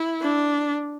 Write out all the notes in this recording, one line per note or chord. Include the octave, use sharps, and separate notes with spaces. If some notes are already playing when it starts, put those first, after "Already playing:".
Already playing: E4
D4